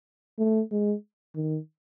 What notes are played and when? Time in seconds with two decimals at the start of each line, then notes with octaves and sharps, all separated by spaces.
0.38 A3
0.71 G#3
1.35 D#3